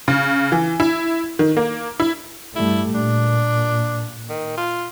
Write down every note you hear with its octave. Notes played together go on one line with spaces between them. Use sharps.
C#3
E3
E4
D#3
A#3
E4
G2 G3 A3 E4
A#2 D4
D#3
F4